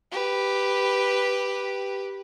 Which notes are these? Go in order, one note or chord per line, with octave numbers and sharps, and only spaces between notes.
G4 B4